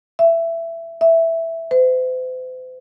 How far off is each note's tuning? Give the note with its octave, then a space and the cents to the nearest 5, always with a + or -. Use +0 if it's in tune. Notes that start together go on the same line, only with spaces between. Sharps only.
E5 +15
E5 +0
C5 -45